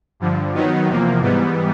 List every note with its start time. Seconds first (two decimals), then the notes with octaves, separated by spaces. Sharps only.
0.20 G2 D3 F3
0.53 D#3 F#3 B3 D#4
0.88 E2 C3 F3 A#3
1.21 G#2 E3 G3 B3